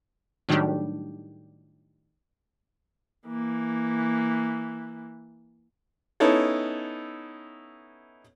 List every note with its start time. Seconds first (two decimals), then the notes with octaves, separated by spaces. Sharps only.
0.49 A2 D#3 F#3 G3 D4 G4
3.26 E3 A#3
6.20 B3 C#4 D#4 E4 A4 C#5